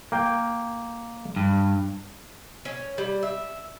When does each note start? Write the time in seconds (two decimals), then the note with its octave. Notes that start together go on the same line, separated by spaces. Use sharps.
0.12 A#3 G5
1.36 G2
2.65 C#4
2.98 G3
3.23 E5